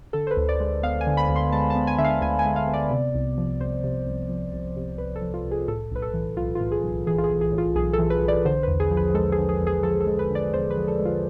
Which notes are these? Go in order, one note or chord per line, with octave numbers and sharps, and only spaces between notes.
D3 A4
C5
B4
D2
D5
G#3
B3 F5
G#5
D3
B5
D2
C6
G#3 A5
A5
B3
G#5
D3 E5
F5
D2 G#5
G#5
G#3
F5
B3
D5
C3
C2
F3
C2 C5
C3
C2
F3
C2
C3
C2 B4
A4
F3
F4
C2
G#4
A2 A4
B1 B4
A4
E3
B1 F4
F4
A2
G#4
B1
E3 G#4
F4
G#4
B1
G#4
A2
F4
B1 G#4
A4
E3
B4
B1
D5
D3 C5
E2 B4
G#4
F3
B4
G#3 A4
G#4
D3
G#4
E2
G#4
F3 A4
A4
G#3
B4
D3 D5
E2 C5
B4
F3
A4
G#3
F4